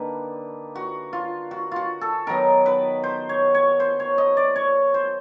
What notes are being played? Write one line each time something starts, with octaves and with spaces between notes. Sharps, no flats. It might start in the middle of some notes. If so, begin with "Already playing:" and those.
Already playing: D3 G3 A#3 D#4 B4
F#4
F4
F#4
F4 F#4
A4
D#3 F#3 B3 D#4 A#4
B4
C5
C#5
C#5
C5
C#5
D#5
D5
C#5
C5